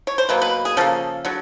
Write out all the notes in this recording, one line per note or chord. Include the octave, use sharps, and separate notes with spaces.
C#5
C5
B2 F#3 A#3 B4
B4
G#4
C#3 F3 A#3 A4
D3 F#3